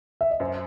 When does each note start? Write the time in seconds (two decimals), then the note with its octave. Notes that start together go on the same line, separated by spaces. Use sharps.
0.21 E5
0.31 D#5
0.40 F#2 C5